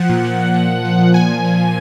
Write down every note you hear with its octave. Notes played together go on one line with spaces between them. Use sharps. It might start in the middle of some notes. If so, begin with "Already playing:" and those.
Already playing: F3 F#5
A#2
F3
A#2
F3
A#2
F3
A#2
F3 G#5
A#2
F3
A#2